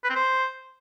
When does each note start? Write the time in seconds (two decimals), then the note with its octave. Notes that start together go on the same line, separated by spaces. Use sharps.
0.04 B4
0.10 C4
0.16 C5